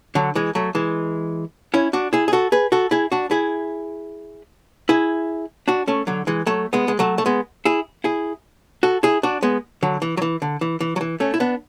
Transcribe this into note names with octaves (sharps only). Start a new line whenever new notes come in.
D3 F#3
E3 G#3
F#3 A3
E3 G#3
C#4 E4
D4 F#4
E4 G#4
G#4
F#4 A4
G#4 B4
F#4 A4
E4 G#4
D4 F#4
E4 G#4
E4 G#4
D4 F#4
A3 C#4
D3 F#3
E3 G#3
F#3 A3
G#3 B3
G#3
F#3 A3
A3
G#3 B3
E4 G#4
E4 G#4
F#4 A4
E4 G#4
D4 F#4
G#3 B3
D3 F#3
E3
F#3
E3
D3
E3
E3
F#3
E3
A3 C#4
E4
B3 D4